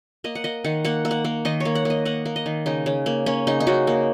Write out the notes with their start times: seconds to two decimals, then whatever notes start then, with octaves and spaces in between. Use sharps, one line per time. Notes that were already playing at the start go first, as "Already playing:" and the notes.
0.24 A#3 D#5
0.35 F#5
0.44 A#3 D#5
0.64 D#3 F#5
0.85 A#3 F#5
1.05 A#3
1.11 F#5
1.25 A#3
1.45 D#3 D#5
1.60 C#5
1.65 A#3
1.75 F#5
1.85 A#3 D#5
2.05 A#3 F#5
2.25 A#3
2.36 D#5
2.46 D#3
2.66 C#3 D#4
2.86 C#3
3.06 A#3
3.26 A#3 C#4
3.47 C#3 D#4
3.60 D#4
3.67 C#3 F#4
3.87 A#3